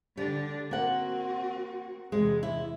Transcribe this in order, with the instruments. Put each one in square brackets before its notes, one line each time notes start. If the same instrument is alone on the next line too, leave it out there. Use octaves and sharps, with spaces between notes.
[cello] D3 D4 [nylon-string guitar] G3
[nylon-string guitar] A#3 F#5 [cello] C4 F#4
[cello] E2 C3 [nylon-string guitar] G#3
[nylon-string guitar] E4